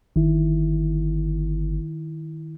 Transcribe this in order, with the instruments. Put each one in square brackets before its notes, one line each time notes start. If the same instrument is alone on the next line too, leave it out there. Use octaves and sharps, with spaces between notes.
[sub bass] G1 [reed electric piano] D#3 E4